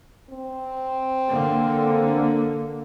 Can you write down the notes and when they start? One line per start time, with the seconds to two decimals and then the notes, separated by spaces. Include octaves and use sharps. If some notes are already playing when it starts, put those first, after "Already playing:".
0.30 C4
1.30 D3 A#3